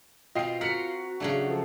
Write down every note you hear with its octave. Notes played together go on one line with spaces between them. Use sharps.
B2 C4 F4 D#5 G5 C7
F#4 A#4 F#5 B6 C#7
C#3 F#3 A3 D4
F3 A4